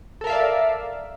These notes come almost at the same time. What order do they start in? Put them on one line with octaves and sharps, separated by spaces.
A4 A#4 E5 F5 D5